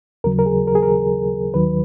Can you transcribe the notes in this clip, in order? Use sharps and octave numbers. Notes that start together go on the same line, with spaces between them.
D#2 C#3 F#3 A#4
A#4
G#4
A#4
G#4
A#4
D#2 D#3 F#3 B4